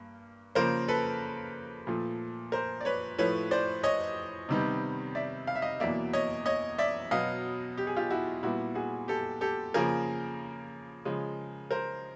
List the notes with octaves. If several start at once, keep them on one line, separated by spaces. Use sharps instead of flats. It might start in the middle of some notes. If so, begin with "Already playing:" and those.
Already playing: G2 A#3
C#3 F3 A#3 A#4 C5
A4 B4
A#2 F3 A3
A#4 C5
D5
B4 C#5
A2 F3 A3 B4 C#5
C5 D5
C#5 D#5
C3 D#3 G3 B3
D5 E5
F5
E5
D#5 F5
E2 B2 F#3 A#3 D5 E5
C#5 D#5
C#5 D#5
D5 E5
B2 F#3 B3 D#5 F5
G4
G#4
F4 G4
E4 F#4
A#2 G3 B3 E4 F#4
F#4 G#4
G4 A4
G4 A4
C#3 F3 A#3 G#4 A#4
C#3 F3 G#3
A#4 C5